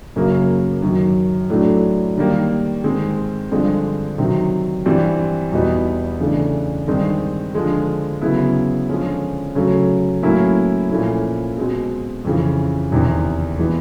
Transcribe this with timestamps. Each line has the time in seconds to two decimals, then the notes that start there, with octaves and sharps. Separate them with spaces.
0.16 F#2 C#3 F#3 A#3
0.82 F#2 D#3 F#3
1.50 A2 F#3 A3 D4
2.17 D#3 G3 A#3
2.84 G#2 D#3 G#3 C4
3.51 G2 D3 F3 G#3 C4
4.18 C3 D#3 F#3
4.86 G2 E3 G3 C4
5.52 E2 B2 G3 B3 D#4
6.20 C#3 E3 A3 D4
6.88 G2 D#3 G#3 C4
7.55 D3 F3 G#3
8.22 C#3 F#3 B3 E4
8.88 D3 F3 G#3 C#4
9.55 C#3 F#3 A3 C#4
10.23 A2 F#3 A#3 C#4 E4
10.90 A#2 F3 A3 C#4 E4
11.57 B2 G#3 C4
12.25 F2 C#3 E3
12.92 E2 C3 D#3
13.59 E3 G#3 B3